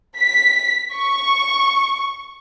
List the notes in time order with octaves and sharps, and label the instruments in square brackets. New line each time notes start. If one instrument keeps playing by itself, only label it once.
[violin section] B6
C#6